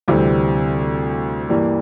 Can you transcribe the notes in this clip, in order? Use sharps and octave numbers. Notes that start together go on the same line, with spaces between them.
D2 C3 E3 G3 C4
G2 E3 G3 A#3